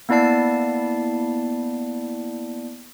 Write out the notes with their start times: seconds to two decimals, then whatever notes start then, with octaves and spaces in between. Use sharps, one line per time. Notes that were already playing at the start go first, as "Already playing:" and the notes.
0.09 A#3 B3 E4 D5 A5 C7